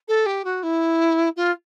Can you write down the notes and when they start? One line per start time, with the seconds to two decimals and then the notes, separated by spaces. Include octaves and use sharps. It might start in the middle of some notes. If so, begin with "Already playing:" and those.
0.08 A4
0.26 G4
0.45 F#4
0.63 E4
1.36 F4